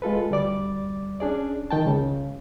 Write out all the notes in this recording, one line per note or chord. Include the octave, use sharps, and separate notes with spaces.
G#3 F4 A4 B4
D2 G3 D5 D6
C#4 D4 G#4 D5
D#3 G5 A5
C#2 C#3